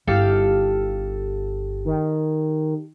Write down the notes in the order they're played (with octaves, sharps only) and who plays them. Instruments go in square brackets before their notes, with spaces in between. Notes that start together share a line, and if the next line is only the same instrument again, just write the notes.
[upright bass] G1 E4 [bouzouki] G4 A4 F5
[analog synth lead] D#3